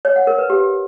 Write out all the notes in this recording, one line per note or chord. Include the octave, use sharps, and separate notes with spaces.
C#5
F#5
A#4
B4
G4